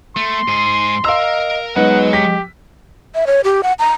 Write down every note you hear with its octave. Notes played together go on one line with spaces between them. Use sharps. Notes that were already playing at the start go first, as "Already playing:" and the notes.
A3 C6
G#2 G#4
A#4 D#5 F5 A#5 E6
F#3 G#3 B3 D#4 B4 F#5
G4 B6
E5
C#5
G4
F#5
A#5